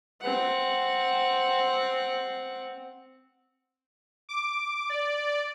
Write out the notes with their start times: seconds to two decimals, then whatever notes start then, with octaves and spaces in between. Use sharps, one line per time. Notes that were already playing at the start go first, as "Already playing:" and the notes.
0.21 C4 F#5
4.29 D6
4.89 D5